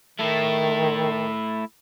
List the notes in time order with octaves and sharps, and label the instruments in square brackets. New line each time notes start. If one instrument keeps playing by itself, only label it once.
[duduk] D#3 [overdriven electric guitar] A3 E4